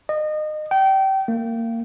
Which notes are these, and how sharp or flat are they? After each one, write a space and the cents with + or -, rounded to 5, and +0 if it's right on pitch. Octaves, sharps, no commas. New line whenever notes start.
D#5 -30
G5 -25
A#3 -30